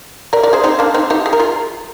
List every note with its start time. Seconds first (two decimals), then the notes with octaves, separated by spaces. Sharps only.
0.33 A#4 D5
0.43 A#4 D5
0.53 G#4 C5
0.64 C4 D#4
0.79 A#3 D4
0.94 C4 D#4
1.10 D#4 G4
1.26 G#4
1.33 A#4
1.40 F4 G#4